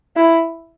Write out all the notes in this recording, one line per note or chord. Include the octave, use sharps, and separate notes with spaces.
E4